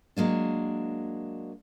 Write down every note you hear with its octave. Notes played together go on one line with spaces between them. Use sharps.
F#3 G#3 A#3 D4